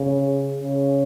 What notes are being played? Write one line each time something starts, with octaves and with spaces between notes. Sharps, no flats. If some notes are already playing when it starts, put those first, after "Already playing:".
Already playing: C#3
C#3